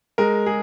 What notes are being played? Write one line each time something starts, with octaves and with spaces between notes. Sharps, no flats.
G#3 A#4
G#4